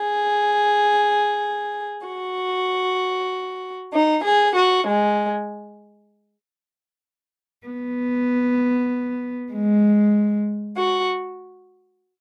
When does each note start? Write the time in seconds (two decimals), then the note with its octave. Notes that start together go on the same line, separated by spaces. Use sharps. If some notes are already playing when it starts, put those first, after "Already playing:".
Already playing: G#4
2.06 F#4
3.93 D#4
4.23 G#4
4.55 F#4
4.86 G#3
7.65 B3
9.52 G#3
10.76 F#4